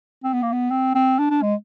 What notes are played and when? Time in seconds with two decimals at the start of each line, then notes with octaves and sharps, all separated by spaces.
0.23 C4
0.33 B3
0.42 A#3
0.52 B3
0.70 C4
0.95 C4
1.19 D4
1.30 D4
1.42 G#3